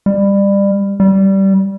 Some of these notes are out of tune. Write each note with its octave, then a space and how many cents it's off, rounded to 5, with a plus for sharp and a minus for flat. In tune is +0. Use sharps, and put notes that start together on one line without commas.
G3 +25
G3 -15